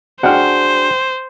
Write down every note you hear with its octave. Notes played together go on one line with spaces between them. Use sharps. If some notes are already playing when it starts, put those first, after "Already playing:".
D4 F#4 G#4 C5 F#5 G5 F6